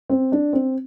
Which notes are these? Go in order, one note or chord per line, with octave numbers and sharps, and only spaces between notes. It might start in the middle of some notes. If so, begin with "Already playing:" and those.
C4
D4
C4